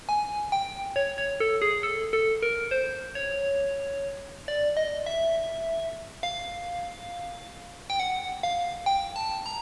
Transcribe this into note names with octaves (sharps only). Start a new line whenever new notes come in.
G#5
G5
C#5
C#5
A4
G#4
A4
A4
A#4
C5
C#5
D5
D#5
E5
F5
G5
F#5
F5
G5
A5
A#5